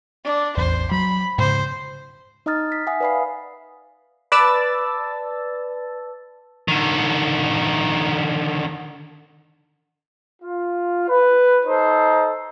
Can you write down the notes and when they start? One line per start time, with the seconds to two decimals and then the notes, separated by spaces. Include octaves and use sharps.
0.24 D4
0.57 A1 E2 C5
0.91 F#3 B5
1.38 G#2 C#3 C5
2.46 D#4 D#5 A#5 D#6 F6 A6
2.72 B6
2.87 E5 F#5 G#5 D#6
3.00 B4 D5 F5 B5 C7
4.32 B4 D5 A5 E6 A6
6.68 D3 D#3
10.41 F4
11.09 B4
11.66 D#4 A4 C5